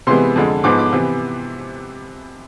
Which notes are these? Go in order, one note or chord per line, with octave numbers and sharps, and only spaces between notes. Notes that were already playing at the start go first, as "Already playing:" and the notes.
C3 E3 G#3 B3 C6
F2 D3 G#3
G#2 F3 G#3 B3 D6
D6
C3 E3 B3